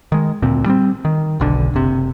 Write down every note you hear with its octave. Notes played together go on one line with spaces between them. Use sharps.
D#3 G#3
D2 A#2 C4
G3 B3 C4
D#3
F#1 B1 D3
F#1 C3